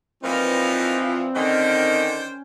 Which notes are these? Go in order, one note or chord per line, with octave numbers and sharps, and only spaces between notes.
E3 F3 A#3 C4 D#4 F4 B4 D5
D3 D#3 C#4 C5 G5